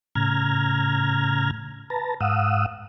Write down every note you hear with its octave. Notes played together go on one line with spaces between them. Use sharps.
A2 C#3 A#5 F6 G#6
B4 A5 A#5
G#2 F5 F#5 D#6 E6